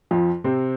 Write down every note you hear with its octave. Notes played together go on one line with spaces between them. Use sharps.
F2 F3
C3 C4